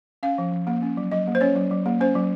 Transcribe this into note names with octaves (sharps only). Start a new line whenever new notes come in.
C#4 F5
F3
F3
A#3
C#4
F#3
F#3 D#5
A#3
C5
C#4 C#5
F#3
F#3
A#3
C#4 C5
F#3